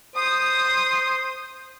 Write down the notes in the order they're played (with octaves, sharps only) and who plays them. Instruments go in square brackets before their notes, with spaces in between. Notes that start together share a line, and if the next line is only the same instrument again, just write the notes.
[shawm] C5 [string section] D#6